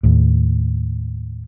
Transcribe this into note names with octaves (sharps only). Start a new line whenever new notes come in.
D#2 A2